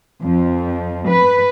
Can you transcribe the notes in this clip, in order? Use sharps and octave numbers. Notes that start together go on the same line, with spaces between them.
F2
B4